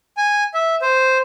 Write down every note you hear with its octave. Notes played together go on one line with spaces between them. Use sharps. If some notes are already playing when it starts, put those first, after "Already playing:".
G#5
E5
C5